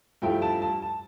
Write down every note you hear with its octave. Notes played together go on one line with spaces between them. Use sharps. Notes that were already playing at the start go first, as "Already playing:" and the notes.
G2 F3 A3 E4 G5
A5
A5
A5